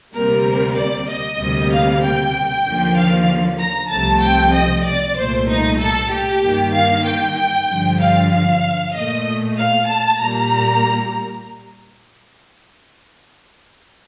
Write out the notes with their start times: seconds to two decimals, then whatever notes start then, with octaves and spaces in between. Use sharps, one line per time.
0.13 D2 C3 G3 A#3 A#4
0.77 D5
1.08 D#5
1.39 D2 C3 G3 A#3
1.71 F5
2.02 G5
2.65 D#2 D3 F3 A#3
2.96 F5
3.59 A#5
3.90 C2 C3 F3 A3 A5
4.23 G5
4.54 D#5
4.85 D5
5.16 C2 A#2 A3 C5
5.48 D#4
5.80 A4
6.11 G4
6.42 G2 D#3 A#3
6.74 F5
7.06 G5
7.69 G2 D3 F3
7.99 F5
8.94 A#2 A3 D#5
9.57 F5
9.88 A5
10.20 A#2 G3 A#3 A#5